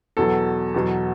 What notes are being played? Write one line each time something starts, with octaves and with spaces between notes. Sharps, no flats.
E2 B2 F#3 A4
E2 B2 F#3